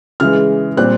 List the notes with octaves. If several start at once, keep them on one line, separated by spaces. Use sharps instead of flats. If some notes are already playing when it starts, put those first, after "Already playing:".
C#3 E3 G#3 F6
A#2 G3 C4 F#6